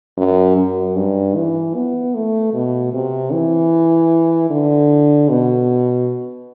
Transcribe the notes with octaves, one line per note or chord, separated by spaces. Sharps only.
F#2
F#2
G2
E3
B3
A3
B2
C3
E3
D3
B2